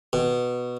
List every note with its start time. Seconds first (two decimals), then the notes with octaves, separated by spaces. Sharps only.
0.13 B2